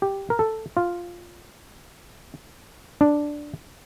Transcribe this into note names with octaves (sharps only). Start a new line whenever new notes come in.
G4
A#4
A4
F4
D4